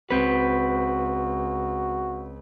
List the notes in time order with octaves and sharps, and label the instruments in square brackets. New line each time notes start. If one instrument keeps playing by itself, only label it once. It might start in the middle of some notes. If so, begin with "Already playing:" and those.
[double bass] C#2 [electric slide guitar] C4 B4 [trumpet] F#4